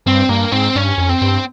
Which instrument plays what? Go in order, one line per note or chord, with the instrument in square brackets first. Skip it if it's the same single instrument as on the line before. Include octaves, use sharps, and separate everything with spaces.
[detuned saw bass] G2 [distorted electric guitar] C4
[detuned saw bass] G2 [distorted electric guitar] A#3
[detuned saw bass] G#2 [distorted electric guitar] C4
[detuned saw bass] G2 [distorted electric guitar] C#4
[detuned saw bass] F2
[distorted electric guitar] C4
[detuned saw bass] G2